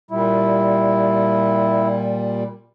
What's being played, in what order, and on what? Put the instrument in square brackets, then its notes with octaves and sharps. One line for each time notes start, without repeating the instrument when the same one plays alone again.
[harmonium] A#2 G3 [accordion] E4